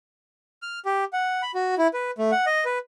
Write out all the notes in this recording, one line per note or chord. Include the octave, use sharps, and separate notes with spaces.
F6
G4
F#5
B5
F#4
E4
B4
A3
F#5
D#5
B4